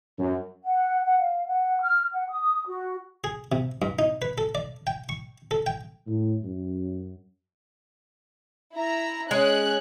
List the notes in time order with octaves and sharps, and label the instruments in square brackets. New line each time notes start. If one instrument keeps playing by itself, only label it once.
[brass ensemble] F#2
[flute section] F#5
F#5
F5
F#5
F6
F#5
D#6
F#4
[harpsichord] G#4
C3
G2
D#4
B4
A4
D5
G5
C#6
A4
G5
[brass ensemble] A2
F#2
[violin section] E4 E5 A#5
[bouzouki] G#3 [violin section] C#4 C#5 F#6